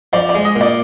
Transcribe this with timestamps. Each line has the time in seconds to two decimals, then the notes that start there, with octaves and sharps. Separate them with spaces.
0.13 F3 D5
0.29 D5
0.35 G#3
0.45 D#5
0.56 A#2
0.61 D5